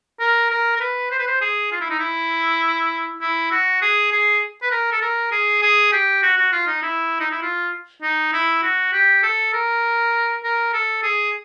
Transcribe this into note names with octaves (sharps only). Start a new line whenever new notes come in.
A#4
A#4
A#4
B4
C5
B4
C5
G#4
F4
E4
D#4
E4
E4
F#4
G#4
G#4
B4
A#4
A4
A#4
G#4
G#4
G4
F#4
F#4
F4
D#4
E4
D#4
E4
F4
D#4
E4
F#4
G4
A4
A#4
A#4
A4
G#4